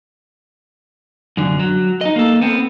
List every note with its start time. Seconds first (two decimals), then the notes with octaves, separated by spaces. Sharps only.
1.37 F#2 D3
1.59 F#3
2.01 D#4 D#5
2.16 A#3 A4
2.41 B3 C4